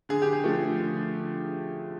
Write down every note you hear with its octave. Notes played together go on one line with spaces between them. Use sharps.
D3 G#4
G4
G#4
F3 A3
D3